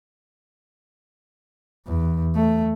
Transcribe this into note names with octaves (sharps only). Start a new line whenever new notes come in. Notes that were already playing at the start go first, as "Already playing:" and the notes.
E2
A3